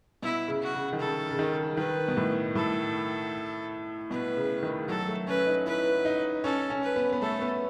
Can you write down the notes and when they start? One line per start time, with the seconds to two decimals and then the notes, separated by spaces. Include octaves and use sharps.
0.23 B2 E4
0.48 C#3
0.62 F#4
0.75 C#3
0.93 D#3
1.00 C#3 A4
1.31 C#3
1.39 D#3
1.77 D#3 B4
2.08 B2
2.17 A2
2.55 A2 A4
4.11 B2 B4
4.37 C#3
4.63 D#3
4.88 F#3 A4
5.08 A3
5.27 C#4 B4
5.47 D#4
5.66 E4 B4
6.05 D#4
6.44 C#4 A4
6.70 C#4
6.83 B4
6.96 B3
7.13 B3
7.22 A3 A4
7.42 B3